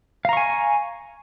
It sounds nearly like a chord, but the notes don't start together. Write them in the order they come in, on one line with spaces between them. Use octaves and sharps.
F5 A#5 C#6 G#5